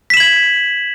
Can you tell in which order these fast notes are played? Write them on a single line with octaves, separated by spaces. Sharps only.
B6 E7 F#7 G#6